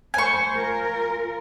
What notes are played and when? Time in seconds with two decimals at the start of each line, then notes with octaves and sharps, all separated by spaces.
0.14 A3 C5 G#5 C#6
0.52 F4 A#4